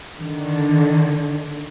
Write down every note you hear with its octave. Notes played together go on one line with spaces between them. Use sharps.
D3 D#3